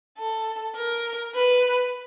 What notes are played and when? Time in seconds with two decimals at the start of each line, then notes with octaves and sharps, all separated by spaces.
0.18 A4
0.76 A#4
1.34 B4